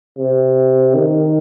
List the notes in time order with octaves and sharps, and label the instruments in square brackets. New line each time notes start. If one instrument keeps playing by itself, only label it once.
[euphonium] C3
D#3